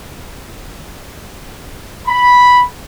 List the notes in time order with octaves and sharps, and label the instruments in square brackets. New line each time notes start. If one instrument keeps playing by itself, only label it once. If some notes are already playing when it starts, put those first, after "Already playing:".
[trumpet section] B5